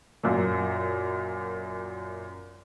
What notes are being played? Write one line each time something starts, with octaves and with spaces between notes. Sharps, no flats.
F#2 A#2